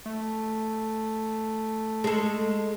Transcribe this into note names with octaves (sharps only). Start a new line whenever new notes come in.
A3
G#3 A4